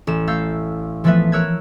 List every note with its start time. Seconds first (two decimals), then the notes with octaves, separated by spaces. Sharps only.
0.07 A1 E7
0.27 A3 F5 E6 G6
1.04 E3 F3 A3 B3 B4 E5
1.32 A#4 C#5 E6 F#6 G#6